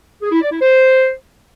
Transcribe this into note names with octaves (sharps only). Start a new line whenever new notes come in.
G#4
E4
D5
E4
C5